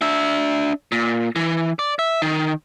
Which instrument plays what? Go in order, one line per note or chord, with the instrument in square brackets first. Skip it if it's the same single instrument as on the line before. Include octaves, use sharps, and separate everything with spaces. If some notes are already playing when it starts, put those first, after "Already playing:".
[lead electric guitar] D4 E5
A#2
E3
D5
E5
D#3